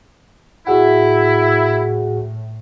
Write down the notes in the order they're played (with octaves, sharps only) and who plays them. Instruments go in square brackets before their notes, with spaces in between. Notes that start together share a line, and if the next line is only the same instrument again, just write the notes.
[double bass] A2 [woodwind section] E4 [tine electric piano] F#4 G#4 F#5